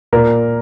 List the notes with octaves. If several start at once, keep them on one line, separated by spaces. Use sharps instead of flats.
A#2 A#4